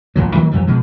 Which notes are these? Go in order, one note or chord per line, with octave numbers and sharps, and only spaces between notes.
A1 D#2 F3 F#3
D#3 E3 F#3 A#3
F2 E3 G3
B2 F3 G#3